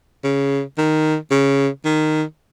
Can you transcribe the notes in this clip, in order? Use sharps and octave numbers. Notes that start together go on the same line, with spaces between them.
C#3
D#3
C#3
D#3